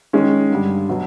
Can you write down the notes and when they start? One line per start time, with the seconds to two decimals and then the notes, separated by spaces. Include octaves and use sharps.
0.13 D#3 G#3 C#4
0.50 G2 D3 G3
0.89 B2 F#3